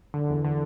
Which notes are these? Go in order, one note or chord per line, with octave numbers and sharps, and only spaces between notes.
D3
E2
D3